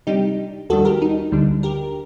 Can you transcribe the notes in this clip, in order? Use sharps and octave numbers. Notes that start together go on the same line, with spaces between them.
C3 G3 D4 D#4 G4
D#2 D#3 G3 D4 F#4 A4
G4 A#4
D#4
D2 D3 G3 D4
G4 A#4